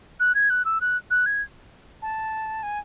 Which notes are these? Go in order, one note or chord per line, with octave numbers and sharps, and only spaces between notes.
F#6
G#6
F#6
E6
F#6
F#6
G#6
A5
G#5